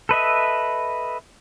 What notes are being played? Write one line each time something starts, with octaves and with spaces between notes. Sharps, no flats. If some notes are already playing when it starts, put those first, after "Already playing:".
A4 B4 D#5 E5